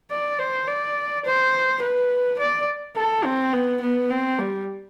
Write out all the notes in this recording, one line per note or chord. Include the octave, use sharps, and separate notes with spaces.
D5
C5
D5
C5
B4
D5
A4
C4
B3
B3
C4
G3